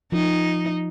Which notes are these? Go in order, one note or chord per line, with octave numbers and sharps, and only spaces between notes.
F3 D#4